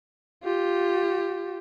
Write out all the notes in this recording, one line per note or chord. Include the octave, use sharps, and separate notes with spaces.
F4 G4